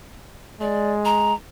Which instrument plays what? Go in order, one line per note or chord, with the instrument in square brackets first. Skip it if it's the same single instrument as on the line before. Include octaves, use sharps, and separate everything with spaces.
[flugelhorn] G#3 [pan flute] D5
[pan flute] A#5